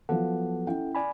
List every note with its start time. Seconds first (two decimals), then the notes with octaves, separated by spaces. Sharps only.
0.09 F3 F#3 B3 A4 F#5
0.67 C#4 E4 G5
0.95 D5 G#5 B5